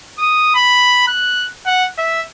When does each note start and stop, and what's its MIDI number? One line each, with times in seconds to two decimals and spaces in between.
0.18 0.55 87
0.55 1.06 83
1.08 1.48 90
1.66 1.86 78
1.98 2.21 76